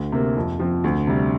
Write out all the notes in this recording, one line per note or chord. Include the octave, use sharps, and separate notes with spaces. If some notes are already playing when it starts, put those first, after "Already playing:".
Already playing: D2
C3 A#3
F2
F3 C4
D2
C3 G3